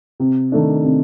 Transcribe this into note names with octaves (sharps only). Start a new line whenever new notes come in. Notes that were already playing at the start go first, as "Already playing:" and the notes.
C3
D#3 A3 D4
C3